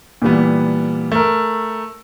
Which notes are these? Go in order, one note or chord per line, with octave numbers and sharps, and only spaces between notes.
A#2 E3 G3 B3
A3 A#4